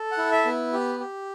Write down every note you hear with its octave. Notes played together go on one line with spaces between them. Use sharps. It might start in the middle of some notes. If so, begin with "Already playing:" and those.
Already playing: A4
F#5
E4
E5
B3
G4
G4